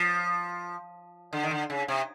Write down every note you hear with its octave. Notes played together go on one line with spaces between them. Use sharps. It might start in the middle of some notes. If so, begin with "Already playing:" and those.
Already playing: F3
D3
D#3
D3
C#3
C3